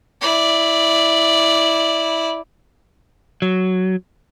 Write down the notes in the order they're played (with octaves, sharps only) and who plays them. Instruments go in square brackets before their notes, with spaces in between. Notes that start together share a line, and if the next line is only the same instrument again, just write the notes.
[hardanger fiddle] E4 D5
[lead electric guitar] F#3